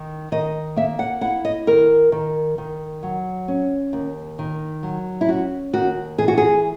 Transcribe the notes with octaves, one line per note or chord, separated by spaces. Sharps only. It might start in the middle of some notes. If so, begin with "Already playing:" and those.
Already playing: D#3
D#3 D#5
A#3 E5
F#5
E4 F#5
D#5
D#3 A#4
D#3
D#3
F#3
C#4
D#2
D#3
F#3
E4
C#4 F#4
D#2 F#4
E3 G#4
F#4
G#4